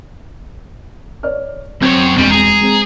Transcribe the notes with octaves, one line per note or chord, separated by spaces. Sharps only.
C#5 D5 F6
F#2 C4 C5 C#5 G#6
E1 G3 C4 D4
G#4 A#5
G#3 C4